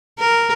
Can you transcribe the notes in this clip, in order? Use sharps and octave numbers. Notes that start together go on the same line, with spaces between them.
A#4